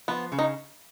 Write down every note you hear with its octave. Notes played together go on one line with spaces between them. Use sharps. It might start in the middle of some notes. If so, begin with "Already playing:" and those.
F3 B3
C#3
D#4